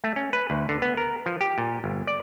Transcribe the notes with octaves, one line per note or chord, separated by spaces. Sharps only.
A3
C#4
B4
D2
D3
B3
A#4
F3
G4
A#2
G1
D5